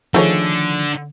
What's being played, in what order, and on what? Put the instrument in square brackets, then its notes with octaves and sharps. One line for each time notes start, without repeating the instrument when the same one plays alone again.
[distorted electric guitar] D3 [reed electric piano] D#3 F3 [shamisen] A3 G#4 C#5